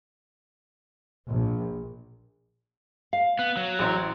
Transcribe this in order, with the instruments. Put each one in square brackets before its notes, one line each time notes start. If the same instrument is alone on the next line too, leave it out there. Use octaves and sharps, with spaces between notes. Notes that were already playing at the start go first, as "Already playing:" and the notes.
[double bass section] A#1
[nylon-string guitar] F5
[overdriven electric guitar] B3
F#3
[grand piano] A1 C5 A#5